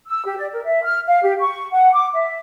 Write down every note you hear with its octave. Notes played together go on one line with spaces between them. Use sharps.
E6
G4
D5
A#4
E5
F6
F5
G4
C#6
F#5
D6
E5